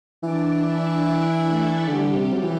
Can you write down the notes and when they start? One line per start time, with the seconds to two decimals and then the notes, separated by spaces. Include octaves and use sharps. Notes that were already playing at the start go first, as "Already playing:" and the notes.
0.22 E3 D4 D5
0.64 E4 E5
1.05 D4 D5
1.46 A3 A4
1.88 D3 G3 G4
2.16 C3
2.33 F#3
2.43 E3